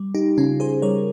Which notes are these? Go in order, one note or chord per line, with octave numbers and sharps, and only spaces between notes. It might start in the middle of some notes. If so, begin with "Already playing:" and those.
Already playing: G3
D#4 G4
C#3 C#4 F4
G#4 C5
G3 A#4 C#5